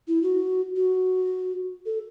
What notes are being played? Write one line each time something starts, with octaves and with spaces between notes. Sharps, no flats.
E4
F#4
F#4
A4